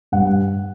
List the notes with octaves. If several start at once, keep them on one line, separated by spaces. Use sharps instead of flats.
G2 F#5